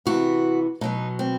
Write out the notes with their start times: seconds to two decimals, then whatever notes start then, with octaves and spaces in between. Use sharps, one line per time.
0.06 C3 E3 B3 F#4
0.81 B2 F#3 B3 D#4
1.19 C4